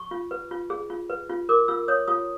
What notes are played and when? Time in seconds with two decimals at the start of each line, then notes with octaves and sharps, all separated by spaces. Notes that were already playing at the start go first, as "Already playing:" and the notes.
Already playing: C#6
0.11 F4
0.31 B4
0.51 F4
0.70 G#4
0.90 F4
1.10 B4
1.29 F4
1.49 A#4 D6
1.68 F4 E6
1.88 C#5 D#6
2.08 F4 D#6